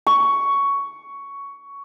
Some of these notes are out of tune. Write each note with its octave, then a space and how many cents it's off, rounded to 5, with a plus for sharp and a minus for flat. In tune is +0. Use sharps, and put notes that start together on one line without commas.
C#6 +10